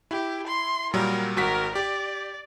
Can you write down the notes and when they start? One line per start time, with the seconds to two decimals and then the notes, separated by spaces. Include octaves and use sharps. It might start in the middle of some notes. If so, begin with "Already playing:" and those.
0.11 E4 G4
0.47 C6
0.94 A#2 F#3 G3 A#4
1.37 G#1 F#4 A#4 B6
1.75 G4 D5